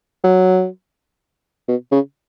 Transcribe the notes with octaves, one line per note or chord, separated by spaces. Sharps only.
F#3
B2
C#3